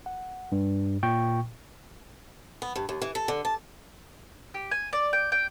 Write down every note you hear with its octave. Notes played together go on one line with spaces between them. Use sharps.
F#5
G2
A#2 G5 C#6
B3
G2
D#2
E3
A4
D3
A5
G4
G#5
D5
G5
G5